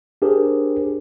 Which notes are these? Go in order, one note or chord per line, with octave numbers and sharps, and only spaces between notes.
D4 G4 G#4 A#4 C5